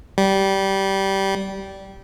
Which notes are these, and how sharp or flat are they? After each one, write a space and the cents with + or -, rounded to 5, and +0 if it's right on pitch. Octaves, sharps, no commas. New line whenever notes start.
G3 -15